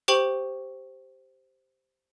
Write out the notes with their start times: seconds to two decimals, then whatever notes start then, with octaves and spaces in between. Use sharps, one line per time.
0.08 G4 C5 G5 C#6 F#7